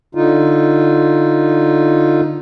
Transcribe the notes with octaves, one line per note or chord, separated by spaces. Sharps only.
D3 D#4 F4